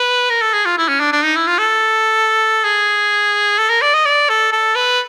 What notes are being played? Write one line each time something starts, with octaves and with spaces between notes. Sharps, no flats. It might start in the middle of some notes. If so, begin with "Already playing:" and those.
Already playing: B4
A#4
A4
G#4
F4
E4
C#4
D4
D4
D#4
E4
F4
A4
G#4
A4
A#4
D5
D#5
D5
A4
A4
B4